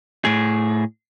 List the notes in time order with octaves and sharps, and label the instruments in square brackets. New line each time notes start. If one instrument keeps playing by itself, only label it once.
[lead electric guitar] A2 G#4